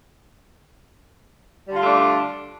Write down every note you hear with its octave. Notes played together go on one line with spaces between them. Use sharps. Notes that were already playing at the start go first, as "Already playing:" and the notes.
D3 G3 A3 D4 F4